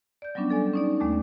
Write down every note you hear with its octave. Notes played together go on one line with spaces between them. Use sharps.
D5 G6
F#3 G3 B3 C#4 D4
A4 D5 G#5
C#4 D#4 D5
D#2 G#3 A3 C#6 D6